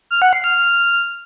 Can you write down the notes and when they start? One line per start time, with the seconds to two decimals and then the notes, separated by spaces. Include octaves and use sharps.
0.11 F6
0.22 F#5
0.33 C7
0.44 F6